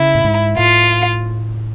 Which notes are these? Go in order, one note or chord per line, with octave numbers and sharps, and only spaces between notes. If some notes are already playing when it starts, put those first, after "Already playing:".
Already playing: C#3 E4
A2
G#2
A2 F4